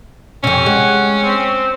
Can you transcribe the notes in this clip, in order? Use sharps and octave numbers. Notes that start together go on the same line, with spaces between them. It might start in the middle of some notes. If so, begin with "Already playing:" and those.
F2 C3 C#4
G#3 F#5
C4